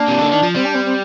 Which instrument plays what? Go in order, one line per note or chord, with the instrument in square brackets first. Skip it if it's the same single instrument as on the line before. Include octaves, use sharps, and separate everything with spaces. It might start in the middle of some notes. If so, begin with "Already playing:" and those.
Already playing: [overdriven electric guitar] A#3 [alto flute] D4
[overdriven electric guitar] C3
D3
D#3
F3
[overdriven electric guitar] G3 [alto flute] C4
[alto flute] D4
C4
C4